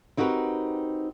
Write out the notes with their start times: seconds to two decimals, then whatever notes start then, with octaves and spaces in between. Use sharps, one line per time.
0.17 C4 D#4 F#4 G4 A#4 B4